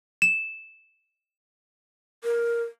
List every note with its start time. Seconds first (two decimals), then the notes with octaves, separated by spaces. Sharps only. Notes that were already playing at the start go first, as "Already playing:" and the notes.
0.22 E7
2.24 A#4